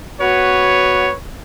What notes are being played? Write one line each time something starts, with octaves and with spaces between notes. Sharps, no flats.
B3 F#4 B4 C#5